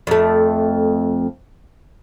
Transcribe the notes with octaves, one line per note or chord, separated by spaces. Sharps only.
F2 A3